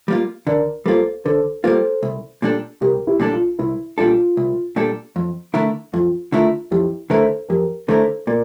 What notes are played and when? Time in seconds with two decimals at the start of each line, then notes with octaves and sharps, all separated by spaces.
0.08 G3 A#3 F4
0.47 D3 A#4 D5
0.86 G3 A#3 F4 A4 C5
1.25 D3 A4 C5
1.64 G3 A#3 F4 A4 C5
2.03 C2
2.42 A#2 G3 D4 A4
2.81 C2 G4 A#4
3.07 E4 G4
3.20 A#2 G3 D4 A4
3.33 F4
3.59 C2 E4
3.98 A#2 G3 D4 F4 A4
4.37 C2
4.76 A#2 G3 D4 A4
5.16 F2
5.54 D3 A3 E4 A#4
5.93 F2 F4
6.32 D3 A3 E4 F4 A#4
6.71 F2 E4 G4
7.10 D3 A3 E4 A4 A#4 C5
7.49 F2 G4 A#4
7.88 D3 A3 E4 A4 A#4 C5
8.27 A#2 A#4 D5